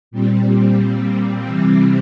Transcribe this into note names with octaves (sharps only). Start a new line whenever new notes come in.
A#2 G3 C4
C3 E3 G3 C4